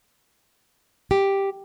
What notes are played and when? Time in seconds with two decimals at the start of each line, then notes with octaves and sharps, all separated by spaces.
1.11 G4